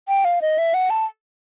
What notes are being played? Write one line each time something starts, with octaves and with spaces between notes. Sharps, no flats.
G5
F5
D#5
E5
F#5
A5